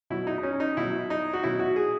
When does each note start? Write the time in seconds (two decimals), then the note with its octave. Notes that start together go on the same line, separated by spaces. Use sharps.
0.10 B2 F#3 E4
0.27 D#4
0.38 D#4
0.43 C#4
0.60 D#4
0.77 B2 F#3 E4
1.10 D#4
1.33 F#4
1.43 B2 F#3 E4
1.59 F#4
1.76 G#4